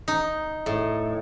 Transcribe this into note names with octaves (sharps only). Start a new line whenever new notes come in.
D#4
A2